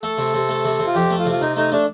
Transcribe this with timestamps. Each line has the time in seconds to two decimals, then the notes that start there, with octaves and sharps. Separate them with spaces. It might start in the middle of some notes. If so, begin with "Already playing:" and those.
0.03 A3 A4
0.18 C3
0.34 C3
0.49 A3
0.65 C3
0.79 C3
0.87 F4
0.95 F2 G4
1.11 A3
1.19 F4
1.26 C3
1.31 F4
1.41 C3 D#4
1.56 A3 D#4
1.72 A3 D4